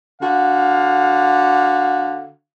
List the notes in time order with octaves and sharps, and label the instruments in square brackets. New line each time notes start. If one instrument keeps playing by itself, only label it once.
[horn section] D3 F#4 F5